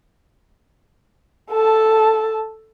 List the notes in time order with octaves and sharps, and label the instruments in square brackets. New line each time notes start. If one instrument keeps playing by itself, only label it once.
[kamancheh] A4 A5